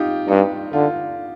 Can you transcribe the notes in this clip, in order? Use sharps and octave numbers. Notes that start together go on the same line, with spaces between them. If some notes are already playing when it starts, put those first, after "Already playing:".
Already playing: D#4 F4 G4
G2 D#4
D3 F4